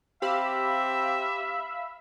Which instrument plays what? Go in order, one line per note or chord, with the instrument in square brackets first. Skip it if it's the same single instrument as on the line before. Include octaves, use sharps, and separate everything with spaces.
[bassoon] C4 [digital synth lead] G4 [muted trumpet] E5 [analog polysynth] F5 B5 E6